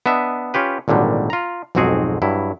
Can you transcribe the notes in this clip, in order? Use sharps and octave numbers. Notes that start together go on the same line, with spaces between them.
B3 D4 D#5 E5
C#4 F4 G4 B4
G#1 A#2 D3 F#3 G3
F4 A#5
B1 F2 G#2 C4 F#4 G#4
G2 F#3 E4